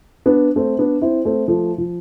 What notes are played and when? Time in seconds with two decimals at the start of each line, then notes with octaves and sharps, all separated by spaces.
0.26 B3 D4
0.56 A3 C4
0.79 B3 D4
1.02 C4 E4
1.25 A3 C4
1.48 F3 A3
1.78 F3